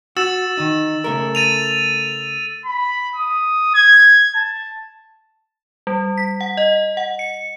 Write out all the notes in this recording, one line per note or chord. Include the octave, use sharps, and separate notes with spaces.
F#4 E6 A6 E7
D#3 D#4
C#3 A3 A#4
A6 D#7 F7
B5
D#6
G#6
A5
G3
B6
F#5
D#5
F#5
C#7